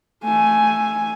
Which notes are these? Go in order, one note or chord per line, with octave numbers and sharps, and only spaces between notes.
A3 G#5